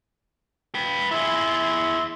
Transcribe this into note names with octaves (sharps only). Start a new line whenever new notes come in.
B4 G5
E4 G#4 E5 C6